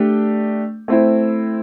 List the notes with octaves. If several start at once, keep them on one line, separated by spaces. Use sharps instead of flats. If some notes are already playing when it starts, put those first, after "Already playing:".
Already playing: A3 D4 G4
A3 C4 E4